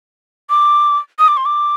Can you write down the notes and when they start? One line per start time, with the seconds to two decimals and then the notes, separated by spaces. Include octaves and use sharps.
0.50 D6
1.19 D#6
1.28 D6
1.37 C6
1.45 D6